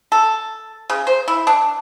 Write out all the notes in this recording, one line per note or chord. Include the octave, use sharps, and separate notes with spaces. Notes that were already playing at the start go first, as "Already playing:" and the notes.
A4
C#3
C5
E4
D4